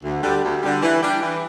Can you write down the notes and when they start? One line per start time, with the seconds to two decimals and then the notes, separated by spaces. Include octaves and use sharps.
0.03 D2
0.22 D3 G3
0.43 D2
0.63 D3 G3
0.82 E3
1.02 G3 D4 G4
1.21 E3